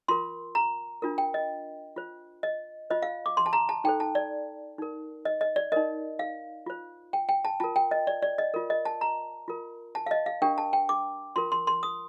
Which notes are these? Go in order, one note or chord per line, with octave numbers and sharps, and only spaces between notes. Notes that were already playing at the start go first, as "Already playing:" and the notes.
F4 A#4 C6
A#5
D4 F4 A#4
G5
D#5
F4 C5
D#5
F4 C5 D#5
F5
D6
C6
A5
A#5
A5
D#4 A4 C5 G5
A5
D5
D#4 A#4
D#5
D#5
D5
D#4 A#4 D#5
F5
F4 C5
G5
G5
A5
F4 A#4 A5
G5
D#5
D5
D5
D#5
F4 A#4
D#5
A5
A#5
F4 A#4
A5
F5
D#5
F5
D4 G4 A#4 G5
A5
G5
D6
F4 A#4 C6
C6
C6
D#6